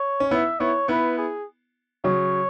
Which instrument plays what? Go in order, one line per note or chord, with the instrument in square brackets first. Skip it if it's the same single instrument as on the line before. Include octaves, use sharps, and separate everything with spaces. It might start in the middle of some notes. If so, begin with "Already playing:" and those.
Already playing: [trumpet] C#5
[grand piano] C#4
[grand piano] B3 E4 [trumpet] E5
[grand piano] B3 E4 [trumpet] C#5
[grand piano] B3 E4 [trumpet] B4
[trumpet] G#4
[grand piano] C#3 F#3 [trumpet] C#5